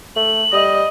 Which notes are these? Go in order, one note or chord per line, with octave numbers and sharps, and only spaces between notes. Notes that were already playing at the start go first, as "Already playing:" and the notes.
A3 F#7
G3 D#5